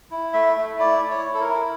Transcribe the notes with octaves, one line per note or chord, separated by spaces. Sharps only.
E4
A3 E5
A3
E4 D5
E4
C#5
E4
A4
A#4
E4